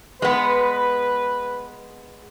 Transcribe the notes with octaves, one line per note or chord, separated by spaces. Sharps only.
G#3 B3 B4